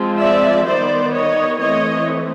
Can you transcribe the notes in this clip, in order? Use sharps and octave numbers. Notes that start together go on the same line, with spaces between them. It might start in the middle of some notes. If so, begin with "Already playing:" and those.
Already playing: F3 G#3 C4
D5 E5
D#3 G3 B3 C5 D5
C#5 D#5
E3 A3 C4 C#5 D#5